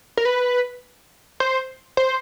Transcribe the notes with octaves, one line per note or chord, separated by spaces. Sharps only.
A#4
B4
C5
C5